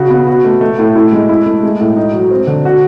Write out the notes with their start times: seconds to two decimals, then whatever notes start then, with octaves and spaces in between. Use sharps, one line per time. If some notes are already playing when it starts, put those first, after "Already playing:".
Already playing: C#3 F#4
0.10 B3
0.27 F#4
0.45 A3
0.61 A3
0.79 A2
0.96 E4
1.12 G#3
1.29 E4
1.46 A3
1.63 G#3
1.80 A2
1.96 D#4
2.13 F#3
2.31 C4
2.47 D3
2.65 F#4